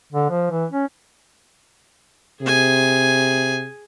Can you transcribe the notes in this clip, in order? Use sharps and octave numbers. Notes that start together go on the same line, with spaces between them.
D3
F3
E3
C#4
C3 G#4 G#5